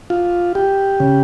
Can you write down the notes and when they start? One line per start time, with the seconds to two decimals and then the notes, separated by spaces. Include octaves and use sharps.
0.10 F4
0.55 G4
1.00 C#3